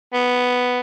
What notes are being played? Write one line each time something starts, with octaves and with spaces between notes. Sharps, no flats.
B3